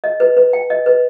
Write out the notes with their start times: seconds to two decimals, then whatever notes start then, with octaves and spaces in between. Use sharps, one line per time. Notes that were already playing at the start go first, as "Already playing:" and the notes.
0.04 D#5
0.20 B4
0.37 B4
0.53 G5
0.70 D#5
0.86 B4